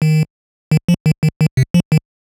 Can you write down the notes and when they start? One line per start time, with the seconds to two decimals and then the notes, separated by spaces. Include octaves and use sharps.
0.02 D#3
0.71 D#3
0.89 F3
1.06 D#3
1.23 D#3
1.41 D#3
1.57 C3
1.74 F3
1.92 D#3